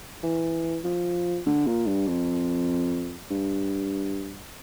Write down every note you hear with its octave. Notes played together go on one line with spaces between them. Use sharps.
E3
F3
D3
A#2
G2
F2
G2